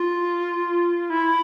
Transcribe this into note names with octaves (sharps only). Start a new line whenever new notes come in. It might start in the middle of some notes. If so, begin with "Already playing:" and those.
Already playing: F4
E4